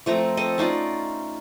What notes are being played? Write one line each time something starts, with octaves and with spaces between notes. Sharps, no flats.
F3 A3 C4 A#5
C4 A4 D#5
C#4 D#4 F4 D5